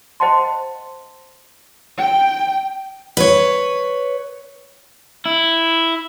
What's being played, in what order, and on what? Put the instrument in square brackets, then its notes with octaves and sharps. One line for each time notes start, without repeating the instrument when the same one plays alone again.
[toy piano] C5 D#5 F#5 G5 A5 C6
[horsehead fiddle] G5
[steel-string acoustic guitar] B4 C#5
[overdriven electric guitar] E4